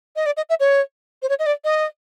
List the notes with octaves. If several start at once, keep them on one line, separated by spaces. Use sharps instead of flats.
D#5
D5
D#5
E5
C#5
C5
C#5
D#5
D5
D#5